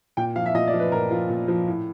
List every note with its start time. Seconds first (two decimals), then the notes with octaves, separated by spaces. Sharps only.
0.17 A#2 G5
0.36 F3 F5
0.46 E5
0.54 A#2 D#5
0.68 D5
0.73 F3
0.80 B4
0.92 A#2 A#4
1.10 F3 F4
1.29 A#2
1.48 F3
1.66 A2